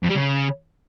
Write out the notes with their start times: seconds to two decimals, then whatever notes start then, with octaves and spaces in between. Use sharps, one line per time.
0.03 F2
0.09 G3
0.15 C#3